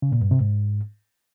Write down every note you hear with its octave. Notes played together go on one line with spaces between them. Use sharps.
C#3
A#2
G2
C3
G#2